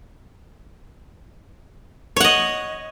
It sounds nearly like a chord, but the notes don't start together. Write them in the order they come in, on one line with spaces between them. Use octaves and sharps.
C#5 F#5 D#5